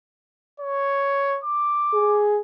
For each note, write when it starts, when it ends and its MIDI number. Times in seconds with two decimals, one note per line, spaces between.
0.60 1.39 73
1.44 2.22 86
1.94 2.40 68